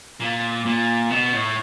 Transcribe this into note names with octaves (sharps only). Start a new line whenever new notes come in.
A#2
A#2
B2
A2